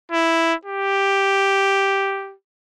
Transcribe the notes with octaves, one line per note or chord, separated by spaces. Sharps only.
E4
G4